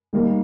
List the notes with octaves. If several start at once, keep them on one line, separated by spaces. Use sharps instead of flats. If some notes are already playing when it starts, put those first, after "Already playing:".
D#3 G3 A#3